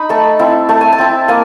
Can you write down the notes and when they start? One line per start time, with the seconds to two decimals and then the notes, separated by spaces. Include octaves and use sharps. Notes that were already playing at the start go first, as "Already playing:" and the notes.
Already playing: D#4 B5
0.09 A3 A5
0.39 C4 E4
0.69 A3 A5
0.81 G#5
0.92 A5
0.98 C4 E4
1.28 A#3 G#5